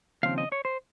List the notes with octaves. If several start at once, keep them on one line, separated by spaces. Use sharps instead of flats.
D#2 C#3 F3 C4 F5
D#5
C#5
C5